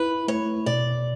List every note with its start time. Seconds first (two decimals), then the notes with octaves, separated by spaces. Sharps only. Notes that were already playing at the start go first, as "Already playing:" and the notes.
Already playing: E4 B4
0.28 A3 C#5
0.66 B2 D5